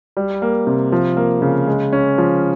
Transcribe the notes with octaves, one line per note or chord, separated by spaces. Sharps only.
G3
A#3
C3
F3
A#3
C#3
G#3
C#4
F3